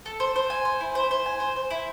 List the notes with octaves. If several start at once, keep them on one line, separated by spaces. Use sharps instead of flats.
A4
C5
C5
G#5
C5
E4
C5
C5
G#5
C5
C5
E4